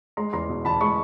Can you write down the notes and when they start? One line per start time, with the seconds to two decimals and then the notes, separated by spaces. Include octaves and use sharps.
0.17 G#3 A#5 C6
0.33 E2 A#5 C6
0.49 B2
0.65 E2 A5 B5
0.81 G#3 B5 C#6